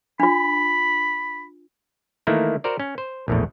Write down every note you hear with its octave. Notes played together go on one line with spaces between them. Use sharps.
D4 F4 B5
D#3 E3 A3 A#3 E4
F#4 A#4 C5 D5
C#4
C5
A#1 E2 A2